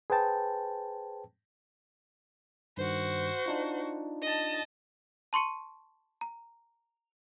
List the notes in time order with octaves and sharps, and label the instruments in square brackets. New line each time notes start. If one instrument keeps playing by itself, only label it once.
[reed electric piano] G#4 B4 C5 G5 A5
[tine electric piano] G2 D#3 [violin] F#4 C5
[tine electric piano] D4 D#4 F4
[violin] D#5 A5
[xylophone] A5 C6 C#6 C#7 D#7
A#5